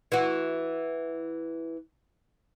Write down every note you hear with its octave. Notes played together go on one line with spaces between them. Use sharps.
E3 F#4